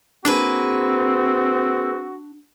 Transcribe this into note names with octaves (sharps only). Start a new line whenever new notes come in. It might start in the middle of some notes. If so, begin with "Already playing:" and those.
A#3 C4 D4 F#4 G#4 B4